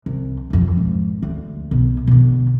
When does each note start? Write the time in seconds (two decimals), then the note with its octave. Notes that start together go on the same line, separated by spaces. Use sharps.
0.06 C2
0.50 B1 F2
0.77 G#1
1.22 D2
1.71 B1 B2
2.07 B2 D3